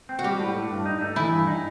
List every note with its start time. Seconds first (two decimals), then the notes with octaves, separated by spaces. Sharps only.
0.09 C4
0.19 F#4
0.24 G3 G4
0.40 A2
0.55 A2
0.70 G2
0.86 D#4
1.01 A3
1.16 E3 E4
1.32 G2
1.47 D#4